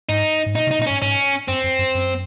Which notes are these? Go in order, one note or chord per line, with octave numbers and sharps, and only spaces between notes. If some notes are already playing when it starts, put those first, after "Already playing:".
G#2 D#4
G#2
A#2 D#4
C3
D#4
A#2
D#4
G#2 C#4
G#2 C#4
F#2 C4
F2
F#2
F#2